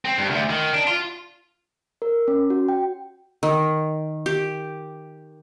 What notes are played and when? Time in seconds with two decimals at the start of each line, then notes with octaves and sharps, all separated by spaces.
0.05 C4
0.18 G2
0.31 D2
0.50 D#3
0.73 D4
0.87 F4
2.02 A#4
2.28 C#4
2.50 F#4
2.69 G5
3.43 D#3
4.26 G4